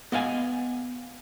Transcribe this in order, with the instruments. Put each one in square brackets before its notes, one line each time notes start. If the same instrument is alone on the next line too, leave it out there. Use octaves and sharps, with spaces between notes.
[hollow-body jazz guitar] B3 D#5 F5 G#5